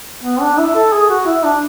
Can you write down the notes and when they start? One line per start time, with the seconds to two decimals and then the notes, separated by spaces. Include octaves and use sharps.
0.24 B3
0.41 D4
0.58 E4
0.75 A4
0.93 G#4
1.10 F#4
1.27 E4
1.44 D4